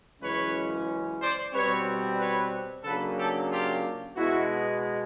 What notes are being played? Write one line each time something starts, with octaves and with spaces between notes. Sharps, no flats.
F#2 C#3 E3 G#3 C#4 B4 C#5
C5 D5
B2 G3 C4 B4 C#5
B4 C#5
C#3 F#3 A#3 D4 A4 B4
G4 A4
F4 G4
B2 G#3 B3 E4 F#4